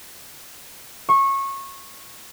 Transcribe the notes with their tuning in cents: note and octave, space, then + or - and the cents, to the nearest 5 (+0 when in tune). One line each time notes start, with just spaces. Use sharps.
C#6 -20